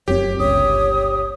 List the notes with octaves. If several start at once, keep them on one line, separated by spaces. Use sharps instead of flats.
F1 F#2 C4 G4 C#5
G1 C#2 C#3 C#5 D#6